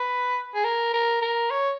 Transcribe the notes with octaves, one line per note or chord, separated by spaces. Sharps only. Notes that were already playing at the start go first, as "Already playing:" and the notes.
Already playing: B4
G#4
A#4
A#4
A#4
C#5